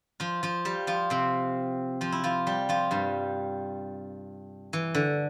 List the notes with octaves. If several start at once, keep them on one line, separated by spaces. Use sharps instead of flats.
F3 F4
F3 F4
G3 G4
F3 F4
C3 C4
F3 F4
E4
F3 F4
G3 G4
F3 F4
G2 G3
E3
D3